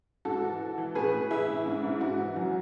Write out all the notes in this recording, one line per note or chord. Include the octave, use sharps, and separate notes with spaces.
G#2 F#4 A4
E3
E3
E3
A2 G#4 B4
A2
E3 E4 G#4
A2
G#2
G#2
G#2 F#4
E3
F#2 F#4